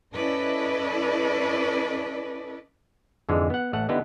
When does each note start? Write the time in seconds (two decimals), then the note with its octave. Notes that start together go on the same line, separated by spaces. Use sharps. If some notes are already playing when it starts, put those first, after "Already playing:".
0.13 C#4 E4 A4 B4 D5 D#5
3.29 F2 G#2 D3 E3 G#3
3.50 B3 F#5
3.73 A1 A3 F#5
3.89 D3 B3 D#4 E4 G4 B4